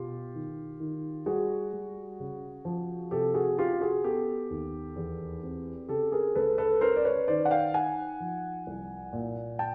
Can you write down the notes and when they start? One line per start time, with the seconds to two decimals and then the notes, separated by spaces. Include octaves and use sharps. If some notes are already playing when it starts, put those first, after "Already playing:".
Already playing: B2 F4 G4
0.34 D#3
0.80 D#3
1.26 G3 F#4 G#4
1.73 G3
2.20 C#3
2.65 F3
3.11 C3 G4 A4
3.34 F#4 G#4
3.58 C#4 F4 G4
3.81 F#4 G#4
4.04 B3 G4 A4
4.50 D#2
4.96 E2
5.43 C4
5.89 C#3 G4 A4
6.12 G#4 A#4
6.35 C#2 A4 B4
6.58 A4 B4
6.81 C#4 A#4 C5
6.96 D5
7.05 B4 C#5
7.28 D#3 C5 D5
7.45 F#5
7.51 F5 G5
7.74 D#4 F#5 G#5
8.20 F3
8.67 C2
9.13 A#2
9.59 G5 A5